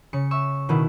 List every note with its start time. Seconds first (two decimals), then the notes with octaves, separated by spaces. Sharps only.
0.13 C#3 C#7
0.31 E5 C#6 E6
0.69 B2 D#3 E4